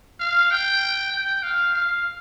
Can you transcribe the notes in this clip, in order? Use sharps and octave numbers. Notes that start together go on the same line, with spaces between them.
F5
G5
G5
F5
F5